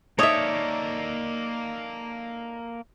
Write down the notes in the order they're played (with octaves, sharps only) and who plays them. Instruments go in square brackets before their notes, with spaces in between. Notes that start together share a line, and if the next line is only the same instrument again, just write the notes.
[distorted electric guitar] A#3 A4 [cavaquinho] D#4 D5 D#6 [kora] C#5 E5